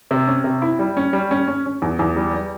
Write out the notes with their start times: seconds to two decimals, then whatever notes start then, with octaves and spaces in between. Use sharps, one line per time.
0.11 C3
0.27 C#4
0.44 C3
0.62 E4
0.79 G3
0.97 C#4
1.13 G3
1.31 C#4
1.48 C#4
1.66 C#4
1.82 E2
1.99 E2
2.16 G3
2.34 G3